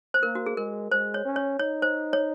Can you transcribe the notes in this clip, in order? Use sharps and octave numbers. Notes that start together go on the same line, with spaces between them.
C5
A#3 A#4
F#4
G#4
G#3 A#4
G#3 C5
C#5
C#4
C#5
D#4 C#5
C5
C#5